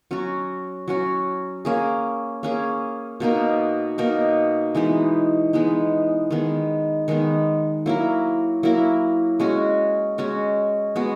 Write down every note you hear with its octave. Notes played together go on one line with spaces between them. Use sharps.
F#3 C#4 F#4
F#3 C#4 F#4
A#3 C#4 G#4
A#3 C#4 G#4
B2 A#3 D#4 A#4
B2 A#3 D#4 A#4
E3 G#3 B3 D#4
E3 G#3 B3 D#4
D#3 G#3 B3
D#3 G#3 B3
F#3 A#3 E4 A#4
F#3 A#3 E4 A#4
G#3 C#4 F#4
G#3 C#4 F#4
G#3 B3 F#4